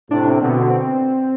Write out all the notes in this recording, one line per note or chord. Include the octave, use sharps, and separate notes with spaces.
A2 C3 D4
C4
B2 D3 C4
B3
C4